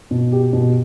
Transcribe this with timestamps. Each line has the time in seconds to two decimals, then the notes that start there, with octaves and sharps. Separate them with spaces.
0.11 B2
0.32 G4
0.53 B2